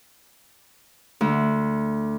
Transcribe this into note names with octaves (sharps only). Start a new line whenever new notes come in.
D2